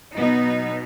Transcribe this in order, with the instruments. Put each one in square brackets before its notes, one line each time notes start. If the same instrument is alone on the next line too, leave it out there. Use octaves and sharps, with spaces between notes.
[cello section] B2 F#3 B3 D#4